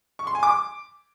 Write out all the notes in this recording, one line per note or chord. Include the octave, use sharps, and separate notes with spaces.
C#6
C6
G#5
D6